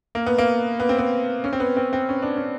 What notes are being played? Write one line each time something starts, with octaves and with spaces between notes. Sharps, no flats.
A#3
B3
A#3
B3
C4
B3
C#4
C4
B3
C4
C4
C#4
D4
C#4